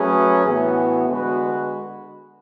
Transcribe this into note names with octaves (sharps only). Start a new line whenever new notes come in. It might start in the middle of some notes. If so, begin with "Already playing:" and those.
Already playing: F#3 A3 C#4 G#4 B4
A2 E3 B3 F#4
D3 G#3 B3 F#4 B4